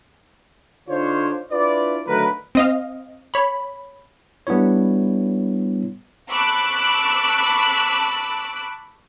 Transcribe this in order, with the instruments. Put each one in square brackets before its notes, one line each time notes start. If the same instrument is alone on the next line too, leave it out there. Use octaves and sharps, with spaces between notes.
[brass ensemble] D3 D4 D#4 F4 C5 C#5
D4 E4 F4 B4 D5
D3 D#3 F#3 A3 A#4 B4
[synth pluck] C4 D#5 F5
C#5 B5
[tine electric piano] G3 B3 D4 E4 C#5
[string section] A5 B5 C#6 D6 E6 F#6